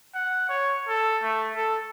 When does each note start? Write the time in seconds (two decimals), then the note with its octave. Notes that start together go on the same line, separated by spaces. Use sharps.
0.15 F#5
0.49 C#5
0.88 A4
1.22 A3
1.56 A4